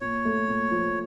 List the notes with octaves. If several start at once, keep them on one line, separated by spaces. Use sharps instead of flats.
A#2 C#5
A3
A#2
F3